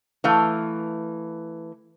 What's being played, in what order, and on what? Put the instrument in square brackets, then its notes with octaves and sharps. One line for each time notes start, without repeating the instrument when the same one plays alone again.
[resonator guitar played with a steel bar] E3 A3 F5